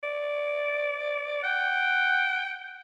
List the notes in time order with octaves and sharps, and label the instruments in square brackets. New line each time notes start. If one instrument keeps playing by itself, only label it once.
[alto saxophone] D5
[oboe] F#5 [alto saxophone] G5